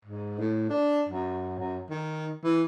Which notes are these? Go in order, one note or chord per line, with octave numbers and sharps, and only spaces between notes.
G#2
A2
D4
F#2
F#2
D#3
E3